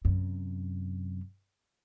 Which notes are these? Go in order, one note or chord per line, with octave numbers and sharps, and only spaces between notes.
F#2 C3